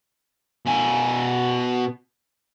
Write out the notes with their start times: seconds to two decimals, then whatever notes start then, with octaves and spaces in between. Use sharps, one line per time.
0.66 B2 G#5